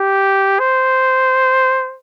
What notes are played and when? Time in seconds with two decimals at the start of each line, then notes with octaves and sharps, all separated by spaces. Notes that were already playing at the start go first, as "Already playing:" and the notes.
Already playing: G4
0.59 C5